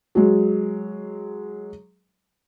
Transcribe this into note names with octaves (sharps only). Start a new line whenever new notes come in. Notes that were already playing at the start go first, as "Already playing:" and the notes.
F#3 G#3